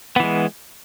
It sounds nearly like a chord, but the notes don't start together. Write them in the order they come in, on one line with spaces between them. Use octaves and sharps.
B3 E3 G#3